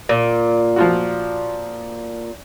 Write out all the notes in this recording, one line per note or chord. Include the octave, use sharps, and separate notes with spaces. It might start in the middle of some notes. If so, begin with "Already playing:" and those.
A#2
F3 F4 F#4